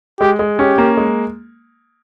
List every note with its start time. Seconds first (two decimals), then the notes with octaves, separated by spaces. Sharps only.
0.20 G#3 G4
0.39 G#3
0.58 C#4 G4
0.78 A#3
0.97 G#3